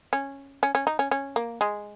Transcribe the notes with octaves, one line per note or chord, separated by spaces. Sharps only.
C#4
C#4
C#4
D#4
C#4
C#4
A#3
G#3